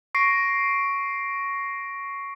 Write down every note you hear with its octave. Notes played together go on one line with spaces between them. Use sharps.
C#6 A#6 C7 D7